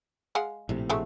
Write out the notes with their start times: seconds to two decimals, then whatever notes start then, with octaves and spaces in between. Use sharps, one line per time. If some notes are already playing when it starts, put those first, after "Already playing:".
0.35 G#3 F5 F#5
0.69 A#1 A2 C3
0.90 F#3 G#3 A3